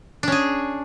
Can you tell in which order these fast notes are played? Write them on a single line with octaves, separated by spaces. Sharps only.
D4 C#4 G#4